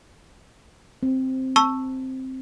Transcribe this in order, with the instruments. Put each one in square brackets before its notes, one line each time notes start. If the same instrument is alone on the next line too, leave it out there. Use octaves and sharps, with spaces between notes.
[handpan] C4
[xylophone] A5 C#6 E6